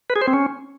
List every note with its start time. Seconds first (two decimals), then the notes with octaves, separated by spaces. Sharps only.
0.10 B4
0.16 G#4
0.22 C5
0.27 C4
0.33 C#4